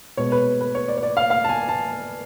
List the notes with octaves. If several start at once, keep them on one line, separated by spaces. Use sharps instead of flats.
B2 G#3 B3 C#5
B4
B4
C#5
D5
C#5
D5
F5
F5
A5
G#5
A5